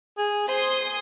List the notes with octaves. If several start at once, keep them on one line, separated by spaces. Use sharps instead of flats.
G#4
C5 G#5 C6 D#6